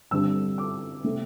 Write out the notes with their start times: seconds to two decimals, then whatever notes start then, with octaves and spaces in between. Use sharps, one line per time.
0.11 G2 D3 G3 C4 E6
0.58 D6
1.04 C3 A3 C4